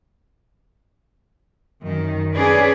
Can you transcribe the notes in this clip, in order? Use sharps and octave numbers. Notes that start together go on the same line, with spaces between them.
F#2 D#3
C#4 D4 G#4 B4 C#5 D5